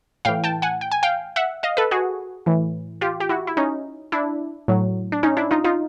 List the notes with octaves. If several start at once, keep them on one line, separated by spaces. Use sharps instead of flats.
A2 E3 F5 G5
G5 A5
F#5 G#5
G5
G#5
F5 G5
E5 F#5
D#5 F5
A4 B4
F#4 G#4
A2 E3
F4 G4
G4
E4 F#4
E4
C#4 D#4
D4 E4
A2 F#3
D4
C#4 D#4
D4 E4
D#4 F4
D#4 F4